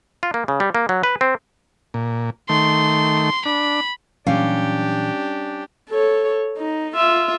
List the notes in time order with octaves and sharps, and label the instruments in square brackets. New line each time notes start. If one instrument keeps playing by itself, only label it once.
[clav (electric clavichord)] F4
A#3
C#3
G3
A#3
F#3
B4
C4
[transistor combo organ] A#2
[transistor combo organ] D#3 A3 [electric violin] C6
[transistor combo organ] D4 [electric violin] B5
[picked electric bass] A#2 E3 F#3 [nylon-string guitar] G3 C#4 F5 [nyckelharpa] D4 G4
[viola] A4 C#5
D#4
F4 E5